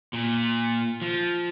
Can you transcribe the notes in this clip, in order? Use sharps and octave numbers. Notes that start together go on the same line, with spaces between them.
A#2
F3